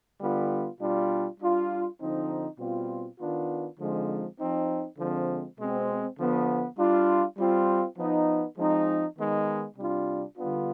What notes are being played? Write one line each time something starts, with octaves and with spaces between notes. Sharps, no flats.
D3 G3 B3 F4
B2 G3 D4 F4
G3 D4 F4
D3 F3 C4 D#4
B2 G3 C4 F4
D#3 B3 D4 F4
D3 F3 G#3 C4 D#4
F3 C4 D#4
D3 F3 G#3 C4
B2 G#3 C4
D3 F3 B3
G3 D4 F4
G3 C4 F4
F3 B3 D#4
F3 G#3 C4 D#4
D#3 G#3 B3 D#4
C3 G3 D4 F4
D3 G3 B3 D4 F4